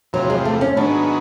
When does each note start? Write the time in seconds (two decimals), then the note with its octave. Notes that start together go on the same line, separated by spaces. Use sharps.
0.13 E2 C3 F3 F#3
0.30 G#3
0.45 A3
0.61 C#4
0.76 G#2 D#3 F#3 B3 D4